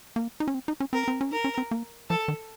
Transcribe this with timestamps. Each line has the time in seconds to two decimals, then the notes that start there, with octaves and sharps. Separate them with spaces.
0.16 A#3
0.40 D#4
0.48 C#4
0.54 C4
0.68 D#4
0.80 C#4
0.93 C4 A#4
1.08 C4
1.21 C#4
1.31 D#4 A#4
1.44 C#4
1.58 C4
1.71 A#3
2.10 F3 A4
2.28 D#3